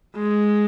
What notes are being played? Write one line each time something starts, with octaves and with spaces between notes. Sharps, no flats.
G#3